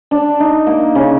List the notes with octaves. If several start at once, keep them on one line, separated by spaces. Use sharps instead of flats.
D4
D#4
A#3
C#3